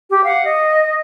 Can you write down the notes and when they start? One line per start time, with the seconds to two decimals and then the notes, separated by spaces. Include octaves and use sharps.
0.10 G4
0.25 F5 F#5
0.44 D#5